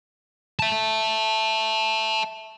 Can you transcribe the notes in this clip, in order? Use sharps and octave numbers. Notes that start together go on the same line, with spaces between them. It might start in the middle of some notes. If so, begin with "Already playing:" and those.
E5 A5